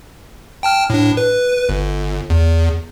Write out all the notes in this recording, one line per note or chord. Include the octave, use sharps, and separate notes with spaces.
G5 A5 F6
A2 D4
B4
G1
E2